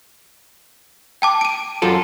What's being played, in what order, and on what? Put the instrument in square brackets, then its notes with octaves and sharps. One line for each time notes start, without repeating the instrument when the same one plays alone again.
[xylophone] G5 A5 D6
D7 D#7
[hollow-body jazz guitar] F#2 F4 A4